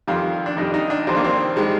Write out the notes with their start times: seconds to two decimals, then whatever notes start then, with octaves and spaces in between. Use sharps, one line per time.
0.07 F2 D#3 G3 F4
0.46 D4
0.57 F2 D#3 G3 D#4
0.74 D#4
0.90 D4
1.07 F2 D#3 G3 C4
1.16 A#3
1.25 C4
1.56 D#3 G3 G#3